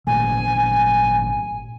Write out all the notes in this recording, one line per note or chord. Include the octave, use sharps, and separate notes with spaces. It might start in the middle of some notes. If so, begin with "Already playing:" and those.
G#1 A#2 A3 G#5